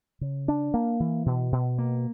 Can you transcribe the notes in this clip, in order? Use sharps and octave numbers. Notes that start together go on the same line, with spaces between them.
C#3
D4
A#3
E3
B2
B2
A#3